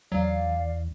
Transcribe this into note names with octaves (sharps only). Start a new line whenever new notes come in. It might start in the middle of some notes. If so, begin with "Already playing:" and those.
E2 F#3 D5 F5